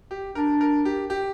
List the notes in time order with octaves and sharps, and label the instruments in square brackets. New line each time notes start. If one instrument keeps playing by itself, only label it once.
[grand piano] G4
[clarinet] D4 [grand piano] A#4
[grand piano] A#4
G4
G4